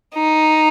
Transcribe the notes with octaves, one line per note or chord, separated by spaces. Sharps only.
D#4